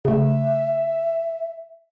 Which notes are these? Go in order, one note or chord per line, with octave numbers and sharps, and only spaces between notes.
C#3 A3 E5